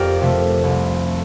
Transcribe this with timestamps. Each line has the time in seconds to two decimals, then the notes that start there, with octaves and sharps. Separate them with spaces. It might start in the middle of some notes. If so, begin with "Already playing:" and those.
Already playing: F2 G4 A#4 D5
0.21 C3 F3 A3
0.63 C2
1.08 A3